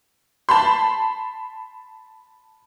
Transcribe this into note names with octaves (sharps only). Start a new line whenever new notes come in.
A5 B5 C6